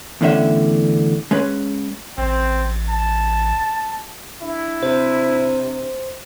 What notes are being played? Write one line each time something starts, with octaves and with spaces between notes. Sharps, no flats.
E2 A2 D3 C#4 E5
G#3 C#4 B4
A1 C4
A5
D4 E4
C3 C5